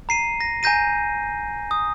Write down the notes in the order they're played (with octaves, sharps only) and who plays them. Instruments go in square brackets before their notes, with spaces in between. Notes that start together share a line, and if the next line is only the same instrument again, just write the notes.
[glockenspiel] A#5 C7 D#7
A#6
G#5 A#5 G6 A#6 D#7
D#6